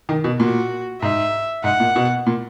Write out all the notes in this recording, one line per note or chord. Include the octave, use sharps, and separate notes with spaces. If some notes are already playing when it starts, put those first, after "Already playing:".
D#3
B2
A#2 F#4
G#2 E5
G#2 F#5
A#2
B2
A#2